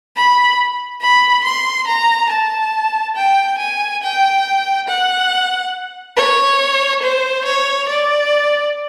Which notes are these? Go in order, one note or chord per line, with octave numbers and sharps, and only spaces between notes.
B5
B5
C6
A#5
A5
G5
G#5
G5
F#5
C#5
C5
C#5
D5